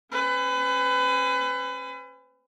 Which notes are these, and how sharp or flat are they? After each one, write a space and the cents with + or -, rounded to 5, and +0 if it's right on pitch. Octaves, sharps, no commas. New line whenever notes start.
C#4 -30 B4 +30